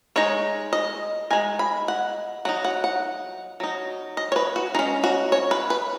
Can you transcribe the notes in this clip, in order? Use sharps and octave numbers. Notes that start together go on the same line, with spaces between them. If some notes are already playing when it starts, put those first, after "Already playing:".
G#3 D#4 C#5
D#5
G#3 D#4 G#5
B5
F#5
F#3 D#4 F#5
F#5
F#5
F#3 D#4
D#5
C#5
B4
F#4
G#3 C#4 D#4
F#4
C#5
B4
B4